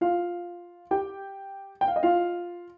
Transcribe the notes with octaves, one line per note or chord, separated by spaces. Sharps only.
F4 F5
G4 G5
G5
F5
D#5
F4 F5